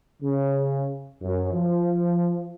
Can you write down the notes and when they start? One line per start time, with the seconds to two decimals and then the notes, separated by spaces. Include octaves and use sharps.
0.22 C#3
1.21 F#2
1.53 F3